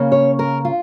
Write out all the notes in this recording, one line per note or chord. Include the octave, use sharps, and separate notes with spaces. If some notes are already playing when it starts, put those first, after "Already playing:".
Already playing: C#3 A#3 C#4
C#5
A#4
F4